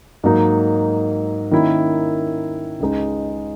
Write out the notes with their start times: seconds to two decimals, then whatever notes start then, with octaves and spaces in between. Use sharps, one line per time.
0.24 G#2 F#3 A#3 D#4
1.51 D#3 A#3 C#4 E4
2.80 C#2 C#3 G#3 D#4